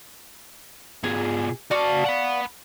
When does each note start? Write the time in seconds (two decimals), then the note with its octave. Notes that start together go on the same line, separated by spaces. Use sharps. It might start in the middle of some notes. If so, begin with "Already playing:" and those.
1.04 B2 F4 G#4
1.71 F#4 D5 F5 A5 C#6
2.05 F#5 B5